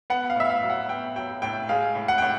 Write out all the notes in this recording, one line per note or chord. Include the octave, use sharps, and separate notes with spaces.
B3 F#5
F5
A2 E5
F5
F#3
F#5
B3 G5
F#3 G5
A2 G5
G#3 F5
A2
F#5
A2 G5